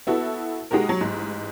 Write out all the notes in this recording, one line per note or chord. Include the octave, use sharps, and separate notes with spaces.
B3 E4 F#4 A4
G#3 D#4 F#4 G4 A#4
F#3
A1 G#2